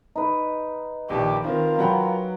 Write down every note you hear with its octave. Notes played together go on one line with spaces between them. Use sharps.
D#4 B4
A#1 D#2 G4
D#3 C4 F4 A#4
F#3 B4 F#5 G5